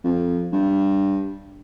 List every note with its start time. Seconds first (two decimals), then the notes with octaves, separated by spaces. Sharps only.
0.04 F2
0.52 G2